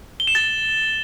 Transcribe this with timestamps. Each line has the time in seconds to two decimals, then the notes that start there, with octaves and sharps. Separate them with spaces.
0.20 G7
0.27 E7
0.35 A6